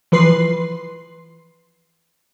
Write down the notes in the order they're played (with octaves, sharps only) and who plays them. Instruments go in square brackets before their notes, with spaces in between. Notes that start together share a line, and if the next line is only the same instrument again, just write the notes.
[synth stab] E3 F3 B4 C6 C7